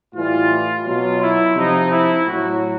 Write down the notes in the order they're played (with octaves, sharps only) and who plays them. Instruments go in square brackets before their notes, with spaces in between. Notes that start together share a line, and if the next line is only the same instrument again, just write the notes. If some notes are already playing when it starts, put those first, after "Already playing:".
[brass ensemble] A2 E3 G3 F4
B2 F#3 F4
E4
C3 F3 D#4
E4
A2 F#3 F#4